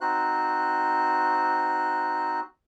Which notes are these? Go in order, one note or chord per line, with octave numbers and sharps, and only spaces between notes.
C4 D#4 F#4 C5 F#6